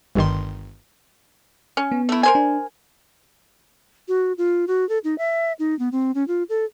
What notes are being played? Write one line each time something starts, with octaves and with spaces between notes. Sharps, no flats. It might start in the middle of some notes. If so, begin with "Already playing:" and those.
G1 G2 D#3 C6
C#4
B3
A3 E4
A#4 C5 G#5
D4
F#4
F4
F#4
A4
D#4
E5
D#4
B3
C4
C#4
F4
A4